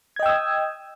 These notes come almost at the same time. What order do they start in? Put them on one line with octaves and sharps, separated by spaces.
G#6 D#5 G5 E6 D#6